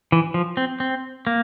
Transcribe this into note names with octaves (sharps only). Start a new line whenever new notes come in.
E3
F3
C4
C4
A#3